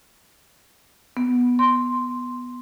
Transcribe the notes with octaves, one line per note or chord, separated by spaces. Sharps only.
B3
C6